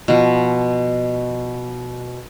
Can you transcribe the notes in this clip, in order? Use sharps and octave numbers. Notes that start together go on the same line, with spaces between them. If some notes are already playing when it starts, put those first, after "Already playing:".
B2 F3